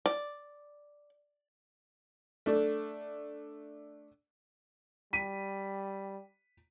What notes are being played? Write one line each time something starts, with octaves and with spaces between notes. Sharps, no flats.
D5
A3 D4
G3 B6 D#7